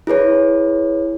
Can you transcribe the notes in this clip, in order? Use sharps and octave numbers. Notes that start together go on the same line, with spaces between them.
E4 G#4 B4 C#5